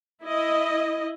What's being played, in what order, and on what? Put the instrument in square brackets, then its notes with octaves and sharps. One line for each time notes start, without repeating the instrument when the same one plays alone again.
[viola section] E4 D#5